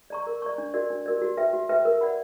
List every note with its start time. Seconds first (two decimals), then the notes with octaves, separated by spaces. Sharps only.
0.10 D5 A#5 C#6
0.27 A#4
0.42 D5 A#5 C#6
0.58 D4
0.74 F#4 A#4 D5
0.90 D4
1.06 F#4 A#4 D5
1.22 F#4
1.37 B4 E5 G5
1.53 F#4
1.69 B4 E5 G5
1.85 A#4
2.01 D5 F#5 B5